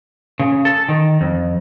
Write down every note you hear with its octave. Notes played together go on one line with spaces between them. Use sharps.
C#3
A4
D#3
F2